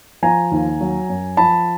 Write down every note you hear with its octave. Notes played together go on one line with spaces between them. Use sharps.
F3 G#5 A#5
D#2
F#3
F#2
F3 A5 B5